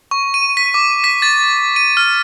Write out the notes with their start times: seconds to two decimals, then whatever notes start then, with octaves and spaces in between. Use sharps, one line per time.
0.11 C#6
0.34 D#7
0.57 B6
0.74 D6
1.04 B6
1.22 A6
1.76 D#7
1.97 F6